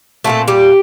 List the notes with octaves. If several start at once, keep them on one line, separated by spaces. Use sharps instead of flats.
A#2 F#3 A3 C4 A4
G3 G4